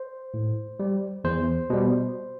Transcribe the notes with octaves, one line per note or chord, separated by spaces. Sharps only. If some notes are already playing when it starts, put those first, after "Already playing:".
Already playing: C5
A2
G3
E2 C5
B2 G3